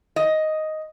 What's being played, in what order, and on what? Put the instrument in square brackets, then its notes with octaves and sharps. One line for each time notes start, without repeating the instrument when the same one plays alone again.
[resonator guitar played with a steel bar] D#5